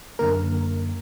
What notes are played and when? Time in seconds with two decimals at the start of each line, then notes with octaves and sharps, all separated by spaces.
0.19 F#2 D3 A#3 A#4